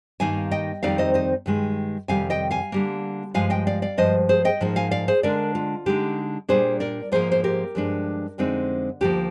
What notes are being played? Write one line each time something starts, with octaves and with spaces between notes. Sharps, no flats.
G2 D#3 A#3 D#4 F5 G#5
D#5 G5
F2 D#3 G3 C4 D#4 D5 F5
C5 D#5
C5 D#5
G2 D#3 G#3
F2 C3 D#3 G3 F5 G#5
D#5 G5
F5 G#5
D3 G3 A#3
G2 F3 G#3 F5 G#5
D#5 G5
D5 F5
D5 F5
G2 F3 G#3 C5 D#5
G#4 C5
D#5 G5
G#2 F3 A#3 D#4
F5 G#5
D5 F5
G#4 C5
D3 G#3 D4 A#4 D5
F4
D3 G#3 D#4 G4
A#2 G3 A#3 D4 G#4 C5
A#4 D5
G#2 F3 A#3 G#4 C5
C5
G4 A#4
G2 F3 G#3 D4
F2 D3 G#3 C4 D#4
D2 D3 F3 A#3 G4